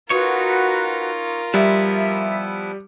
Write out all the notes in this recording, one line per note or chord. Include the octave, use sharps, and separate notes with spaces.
D#4 F4 F#4 A#4 B4 C#5
F3 G3 B3 E4 E5